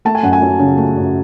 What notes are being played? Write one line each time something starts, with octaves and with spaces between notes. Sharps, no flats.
A3 A5
G#5
F#2 F#5
G#5
F#3
C#3
A3
F#2